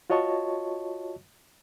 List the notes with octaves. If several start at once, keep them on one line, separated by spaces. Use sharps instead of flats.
F4 F#4 C#5 D#5 A5 C#6